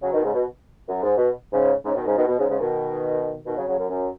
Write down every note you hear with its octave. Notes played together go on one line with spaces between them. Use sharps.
C#3 F#3
B2 D#3
G#2 C#3
B2
F#2
G#2
B2
G#2 C#3
G#2 C#3
B2 D#3
G#2 C#3
B2 D#3
B2
G#2 C#3
G#2 C#3
B2 D#3
B2 D#3
C#3 F#3
C#3 F#3
F#2
F#2